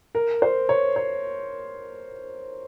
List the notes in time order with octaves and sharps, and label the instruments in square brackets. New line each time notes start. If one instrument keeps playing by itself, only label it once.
[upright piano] A#4
C5
C#5
C#5